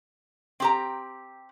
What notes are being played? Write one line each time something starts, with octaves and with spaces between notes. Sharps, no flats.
C4 G4 A#5